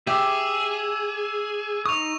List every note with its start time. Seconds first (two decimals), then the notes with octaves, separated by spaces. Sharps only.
0.07 G4 G#4 E5 D6 E6
1.86 D#4 C#6 D#6 F7